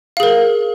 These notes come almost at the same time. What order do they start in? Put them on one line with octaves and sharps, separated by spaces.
F5 G#4 A#4